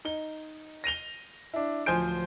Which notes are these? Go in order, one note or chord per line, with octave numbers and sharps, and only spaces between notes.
D#4 G7
A#6 D#7 F7 G7
D4 E4
D1 F3 C5 G#5 G6 D7